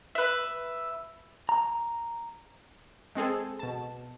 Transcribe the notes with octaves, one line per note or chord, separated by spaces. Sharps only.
B4 E5
A#5
G#3 C4 G#4 A4
B2 A5